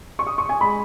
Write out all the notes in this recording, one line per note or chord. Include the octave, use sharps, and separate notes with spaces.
C#6
D#6
C#6
G#5
G#3 B5